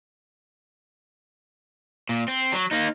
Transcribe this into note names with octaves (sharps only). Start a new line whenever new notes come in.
A#2
C4
F#3
A#3 D#4